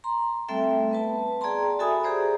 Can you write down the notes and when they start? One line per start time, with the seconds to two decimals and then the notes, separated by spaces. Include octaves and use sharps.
0.04 A#5 C6
0.49 G3 A3 C4 A4 E5 G5
0.91 B3 B4 A5
1.41 G#4 D5 G5 A5 A#5 C6
1.79 F#4 A4 E5 G#5 B5 D#6
2.03 G4 G#4 C5 D5 A#5